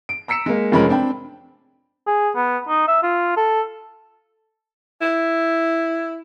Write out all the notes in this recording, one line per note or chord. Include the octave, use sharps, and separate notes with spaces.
D7
A#5 E6 B6 C#7 E7
G#3 A#3
F1 F3 G#3 C#4 A#4 B5
C4 D4 G5 B5
G#4
B3
D#4
E5
F4
A4
E4